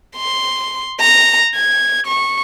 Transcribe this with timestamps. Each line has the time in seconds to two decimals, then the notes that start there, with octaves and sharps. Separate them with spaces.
0.16 C6
1.00 A#5
1.55 G#6
2.07 C#6